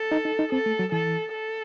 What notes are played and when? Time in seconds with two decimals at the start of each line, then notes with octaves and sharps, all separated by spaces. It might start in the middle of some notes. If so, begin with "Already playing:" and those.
Already playing: A4
0.11 D#4
0.25 D#4
0.39 D#4
0.52 C4 A4
0.66 A3
0.79 F#3
0.92 E3 A4
1.33 A4